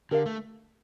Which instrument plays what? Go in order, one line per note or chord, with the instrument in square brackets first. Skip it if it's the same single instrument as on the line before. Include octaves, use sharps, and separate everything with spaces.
[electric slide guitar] D3 [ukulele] G4 A#4 F5
[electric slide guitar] A3